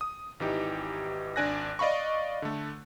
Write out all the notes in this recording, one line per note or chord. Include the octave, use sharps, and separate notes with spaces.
D#6
G#1 E3 D#4 G4
G#1 D4 D5 G#5 F#6 A#6
D5 D#5 F5 B5 C#6
D3 A3